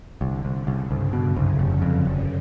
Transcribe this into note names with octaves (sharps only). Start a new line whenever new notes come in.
C2 D3
C2
C#3
C2
C2 G2
B2
F#2
C2
F1
F2
F1